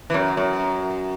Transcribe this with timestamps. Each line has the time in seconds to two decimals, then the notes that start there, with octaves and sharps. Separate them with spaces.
0.10 E3
0.14 F#2
0.37 F#2